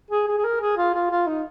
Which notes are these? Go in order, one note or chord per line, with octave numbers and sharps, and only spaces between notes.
G#4
G#4
G#4
A#4
G#4
F4
F4
F4
D#4